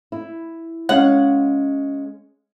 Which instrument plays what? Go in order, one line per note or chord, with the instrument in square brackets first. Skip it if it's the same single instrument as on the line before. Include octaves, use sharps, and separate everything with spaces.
[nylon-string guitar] E4
[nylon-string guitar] G#3 C#4 F5 [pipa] F#5